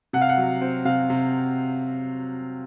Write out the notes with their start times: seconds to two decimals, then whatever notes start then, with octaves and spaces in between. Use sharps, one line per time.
0.13 C3 F#5
0.21 F5
0.29 F#5
0.37 F#3
0.61 C4
0.85 C3 F5
1.10 C3